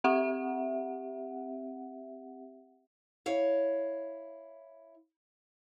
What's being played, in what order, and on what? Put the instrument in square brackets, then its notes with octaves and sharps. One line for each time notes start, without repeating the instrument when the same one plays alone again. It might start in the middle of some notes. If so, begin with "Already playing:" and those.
[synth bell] C4 G4 E5 F#5
[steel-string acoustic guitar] E4 C#5 F5